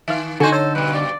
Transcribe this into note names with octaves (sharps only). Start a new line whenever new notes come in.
D#3 E5 F5
D3 D#4 F#4 A4 C5 G#5
A4 C5 C#5
G2 B2 B4
D5